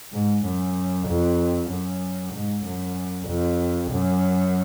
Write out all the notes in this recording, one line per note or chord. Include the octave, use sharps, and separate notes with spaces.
G#2
F#2
F2
F#2
G#2
F#2
F2
F#2